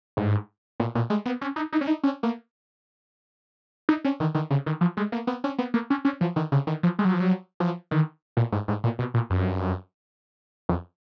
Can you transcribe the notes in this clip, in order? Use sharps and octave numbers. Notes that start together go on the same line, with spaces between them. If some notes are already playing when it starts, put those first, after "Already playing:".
G#2
A#2
A#2
G#3
B3
C#4
D#4
D#4
C#4
D#4
C#4
A#3
D#4
C#4
D#3
D#3
C#3
D#3
F3
G#3
A#3
B3
C#4
B3
A#3
C#4
C#4
F3
D#3
C#3
D#3
F3
G#3
F#3
F3
F#3
F3
D#3
A#2
G#2
G#2
A#2
B2
A#2
F#2
F2